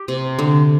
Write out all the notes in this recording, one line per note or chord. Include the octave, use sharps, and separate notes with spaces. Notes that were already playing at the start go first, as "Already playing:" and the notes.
Already playing: G4
C3
D3